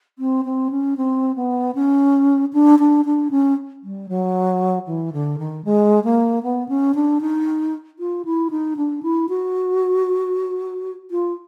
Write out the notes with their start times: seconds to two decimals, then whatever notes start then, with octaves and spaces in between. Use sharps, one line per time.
0.19 C4
0.45 C4
0.70 C#4
0.97 C4
1.36 B3
1.75 C#4
2.53 D4
2.79 D4
3.05 D4
3.31 C#4
3.83 G3
4.09 F#3
4.87 E3
5.13 D3
5.38 D#3
5.65 G#3
6.04 A#3
6.43 B3
6.68 C#4
6.95 D4
7.21 D#4
7.99 F4
8.25 E4
8.51 D#4
8.77 D4
9.03 E4
9.29 F#4
11.11 F4